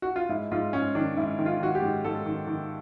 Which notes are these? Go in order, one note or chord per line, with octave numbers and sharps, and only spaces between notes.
F#4
F4
G#2 E4
G#2 F4
G#2 C#4
D#3 D4
G#2 E4
D#3
F4
D#3 F#4
G4
G#2
G#2 A4
D#3
D#3